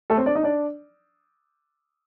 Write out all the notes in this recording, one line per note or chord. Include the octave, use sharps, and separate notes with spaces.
A3 A4
C4 C5
D4 D5
D#4 D#5
D4 D5